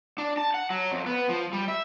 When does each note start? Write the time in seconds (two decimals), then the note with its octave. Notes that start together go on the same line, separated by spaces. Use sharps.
0.18 D4
0.38 A5
0.54 F#5
0.70 F#3
0.92 F2
1.06 B3
1.29 F3
1.53 G3
1.68 E5